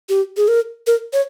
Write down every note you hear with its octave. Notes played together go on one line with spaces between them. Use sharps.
G4
G#4
A#4
A#4
C#5